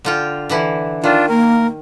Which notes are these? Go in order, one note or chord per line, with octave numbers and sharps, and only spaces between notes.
D3 F4 G5
D3 E3 E4
D#3 D4 F4
A#3 A#4